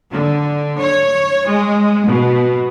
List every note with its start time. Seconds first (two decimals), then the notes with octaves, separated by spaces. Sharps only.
0.13 D3
0.79 C#5
1.47 G#3
2.07 B2